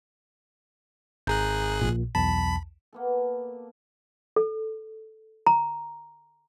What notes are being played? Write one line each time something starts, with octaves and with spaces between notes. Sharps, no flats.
G#1 G#4 A#5 F#6 G6
A#1 A#2
B1 E2 A5 B5
A#3 B3 A4
A4
A#5